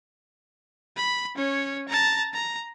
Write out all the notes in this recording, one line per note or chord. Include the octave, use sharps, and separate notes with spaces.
B5
C#4 C#5
A5 A#5
A#5